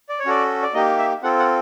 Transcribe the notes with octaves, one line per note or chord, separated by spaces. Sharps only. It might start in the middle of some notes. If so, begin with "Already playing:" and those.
D5
C#5
C#4 F#4 A4 D5
D5
A#3 D#4 G4 D#5
E5
C4 F4 A4 F#5
F#5